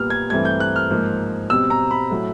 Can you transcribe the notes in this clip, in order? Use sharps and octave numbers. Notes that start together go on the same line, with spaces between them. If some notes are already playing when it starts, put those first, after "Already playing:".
Already playing: A#2 G3 B3 F6
G#6
G2 E3 A3 C4 G#6
G6
F#6
F6
G#2 F3 A#3
B2 G3 C4 E6
A#5
B5
A2 F#3 A3